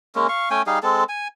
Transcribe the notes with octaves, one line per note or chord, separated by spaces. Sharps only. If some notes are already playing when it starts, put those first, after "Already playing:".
G#3 A#3 C#4
F5 C#6
A3 C#4 G5 G#5
G3 D#4 G#4 F5
G#3 C4 A4
G#5